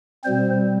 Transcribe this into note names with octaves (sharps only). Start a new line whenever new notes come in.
B2 G3 C4 C5